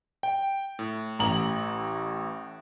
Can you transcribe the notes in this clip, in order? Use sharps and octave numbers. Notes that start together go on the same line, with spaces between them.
G5
A2
A1 A#5 F#7